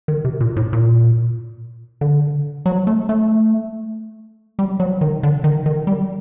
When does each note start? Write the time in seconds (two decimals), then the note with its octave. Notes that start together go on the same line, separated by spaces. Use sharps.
0.08 D#3
0.25 C3
0.41 A#2
0.57 A2
0.73 A#2
2.01 D3
2.66 F#3
2.87 A3
3.09 A3
4.59 G3
4.80 F#3
5.01 D#3
5.23 D3
5.44 D#3
5.66 D#3
5.87 G3